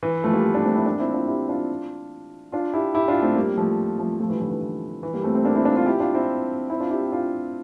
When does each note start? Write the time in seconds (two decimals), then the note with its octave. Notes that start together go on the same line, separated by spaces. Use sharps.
0.03 E3
0.24 F3 A3
0.33 G3 A#3
0.55 A#3 D4
0.65 A3 C4
0.75 C4 E4
0.86 A#3 D4
0.99 C4 E4
1.13 D4 F4
1.27 E4 G4
1.49 D4 F4
2.52 D4 F4
2.74 E4 G4
2.95 E4 G4
3.08 D4 F4
3.22 A3 C4
3.36 G3 A#3
3.57 F3 A3
3.99 F3 A3
4.20 F3 A3
4.30 E3 G3
4.41 D3 F3
4.51 E3
4.61 E3
5.03 E3
5.14 G3 A#3
5.24 A3 C4
5.34 A3 C4
5.44 A#3 D4
5.56 C4 E4
5.65 D4 F4
5.76 D4 F4
5.86 E4 G4
6.00 D4 F4
6.15 C4 E4
6.70 C4 E4
6.80 D4 F4
6.90 E4 G4
7.12 D4 F4